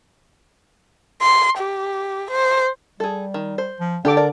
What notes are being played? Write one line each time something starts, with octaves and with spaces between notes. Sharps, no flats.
C6
G4
C5
G3 G#4 A4
D#3
C5
F3
D3 D4 G4 A4 D6
A#4 D5